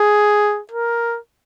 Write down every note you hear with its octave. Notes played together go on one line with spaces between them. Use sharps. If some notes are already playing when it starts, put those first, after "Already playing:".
Already playing: G#4
A#4